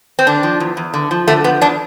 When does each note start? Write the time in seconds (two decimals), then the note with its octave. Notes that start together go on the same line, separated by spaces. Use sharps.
0.19 C4
0.27 D3 D4
0.43 F3
0.60 E2
0.77 E2
0.94 D3
1.11 F3
1.28 D3 A3
1.44 F3 B3
1.61 E2 D4